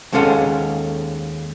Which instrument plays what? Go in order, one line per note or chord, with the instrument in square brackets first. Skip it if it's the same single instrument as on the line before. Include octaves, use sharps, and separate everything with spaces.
[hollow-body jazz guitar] D#2 G#3 C#4 A4 F5 F#5